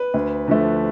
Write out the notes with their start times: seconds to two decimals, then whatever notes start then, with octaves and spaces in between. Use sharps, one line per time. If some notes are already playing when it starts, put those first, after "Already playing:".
Already playing: B4
0.14 D2
0.48 D3 F3 A3